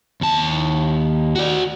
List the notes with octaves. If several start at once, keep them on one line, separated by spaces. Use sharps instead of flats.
D#2 A5
F#4 D5